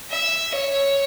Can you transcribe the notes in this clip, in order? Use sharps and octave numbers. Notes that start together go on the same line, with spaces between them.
E5
C#5